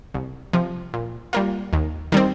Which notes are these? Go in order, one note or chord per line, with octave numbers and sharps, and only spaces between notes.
C2
C3 F3
A#2
G3 A#3 F4
D#2
D#3 G3 C4